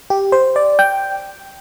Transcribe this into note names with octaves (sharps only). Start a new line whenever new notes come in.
G4
C5
D5
G5